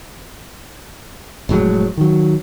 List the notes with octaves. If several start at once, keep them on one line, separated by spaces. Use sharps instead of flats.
F1 A2 F#3 G#3
D#3 F#3